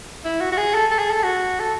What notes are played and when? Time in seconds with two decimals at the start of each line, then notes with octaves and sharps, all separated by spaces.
0.25 E4
0.41 F#4
0.52 F#4
0.58 G#4
0.74 A4
0.91 A4
0.99 G#4
1.11 A4
1.23 F#4
1.60 A4